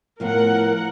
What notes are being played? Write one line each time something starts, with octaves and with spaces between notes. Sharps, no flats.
A2 F3 B3 A#4 F#5